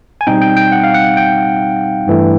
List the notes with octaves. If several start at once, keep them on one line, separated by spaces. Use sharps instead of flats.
G#5
B2 G3 C4 D#4 G5
G5
G5
F#5
F5
F#5
G5
G2 E3 A3